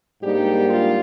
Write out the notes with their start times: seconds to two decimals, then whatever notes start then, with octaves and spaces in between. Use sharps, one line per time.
0.23 G#2 G3 A#3 D4 D#4 G4
0.69 F4